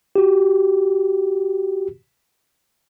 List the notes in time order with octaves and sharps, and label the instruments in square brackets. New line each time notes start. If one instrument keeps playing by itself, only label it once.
[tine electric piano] F#4 G4